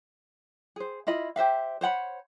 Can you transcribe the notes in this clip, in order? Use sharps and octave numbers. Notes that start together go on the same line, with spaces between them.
G#4 C5
E4 F4 D#5 B5
G4 C5 E5 F5
C5 C#5 F#5 B5